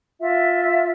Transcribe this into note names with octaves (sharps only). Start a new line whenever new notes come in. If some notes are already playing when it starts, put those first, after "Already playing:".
F4 E5